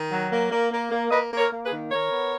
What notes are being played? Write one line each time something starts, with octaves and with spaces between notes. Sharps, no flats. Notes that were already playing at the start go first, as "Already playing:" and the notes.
Already playing: D#3
F#3
A#3
A#3
A#3
A#3
A#3 B4 D#5
A#3
A#4 C#5
A#3
G#4 B4
D#3
D#3 A#4 C#5
B3